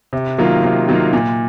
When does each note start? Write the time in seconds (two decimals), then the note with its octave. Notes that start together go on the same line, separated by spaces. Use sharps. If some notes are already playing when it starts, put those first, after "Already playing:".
0.13 C3
0.38 D#3 F#3 A#3 F4
0.63 C3
0.88 D#3 F#3 A#3 F4
1.13 A#2